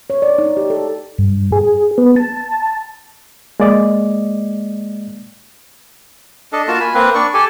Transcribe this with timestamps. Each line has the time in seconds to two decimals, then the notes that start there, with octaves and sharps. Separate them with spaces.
0.10 C#5
0.22 D5
0.38 D#4
0.57 G4
0.70 A4
1.18 G2
1.52 G#4
1.98 B3
2.16 A5
3.60 G#3 A#3 D5 D#5
6.53 D4 A4 D#5
6.68 A#3 F4 F#4 A5
6.80 G#5 B5
6.94 A#3 C4 B4
7.15 D4 D5 C#6
7.34 G4 A4 G#5